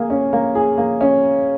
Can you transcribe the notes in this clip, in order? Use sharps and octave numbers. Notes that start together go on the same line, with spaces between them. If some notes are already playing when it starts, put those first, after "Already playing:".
Already playing: A#3 G#4
C#4
A#3
G#4
A#3
C#4